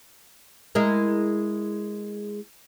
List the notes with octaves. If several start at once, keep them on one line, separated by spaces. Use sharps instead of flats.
G#3 E4 A#4